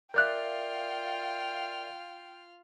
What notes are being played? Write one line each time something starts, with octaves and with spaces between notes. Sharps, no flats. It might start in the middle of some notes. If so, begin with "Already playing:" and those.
F4 A#4 D5 E5 F5 G5 F#6 G6